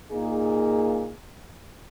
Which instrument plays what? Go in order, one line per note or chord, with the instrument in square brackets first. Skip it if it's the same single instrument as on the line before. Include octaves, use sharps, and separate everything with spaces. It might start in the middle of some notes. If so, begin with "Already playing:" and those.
[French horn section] A#2 A#3 D#4 G#4